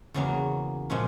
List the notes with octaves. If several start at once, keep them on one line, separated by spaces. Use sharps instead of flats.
E2 C#3 F#3 A#3
A#2 F3 G#3 C#4